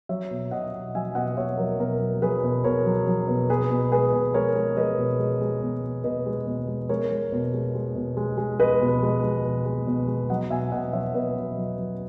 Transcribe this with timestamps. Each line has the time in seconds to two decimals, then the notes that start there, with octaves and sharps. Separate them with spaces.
0.09 F#3 C#5 E5
0.31 B2
0.51 B2 D#5 F#5
0.74 B2
0.95 F#3 E5 G#5
1.15 B2 D#5 F#5
1.37 B2 C#5 E5
1.58 F#3 A#4
1.79 B2 A#4
2.00 F#3
2.22 F#3 G#4 B4
2.43 B2
2.64 B2 A#4 C#5
2.86 F#3
3.07 F#3
3.28 B2
3.50 B2 G#4 B4
3.70 B2
3.91 G#3 G#4 B4
4.13 B2
4.34 G#3 A#4 C#5
4.56 G#3
4.77 G#3 B4 D#5
4.98 B2
5.19 G#3
5.41 G#3
5.62 B2
5.84 B2
6.04 B2 B4 D#5
6.26 G#3
6.47 B2
6.68 G#3
6.89 G#3 A#4 C#5
7.11 G#3
7.32 B2
7.54 G#3
7.75 G#3
7.95 B2
8.17 G#3
8.38 G#3
8.60 G#3 B4 D#5
8.81 B2
9.03 G#3
9.23 G#3
9.45 B2
9.65 G#3
9.87 B2
10.08 G#3
10.30 F#3 D#5 F#5
10.50 B2 E5 G#5
10.72 B2 D#5 F#5
10.93 F#3 C#5 E5
11.14 B2 B4 D#5
11.36 B2
11.57 F#3
11.79 F#3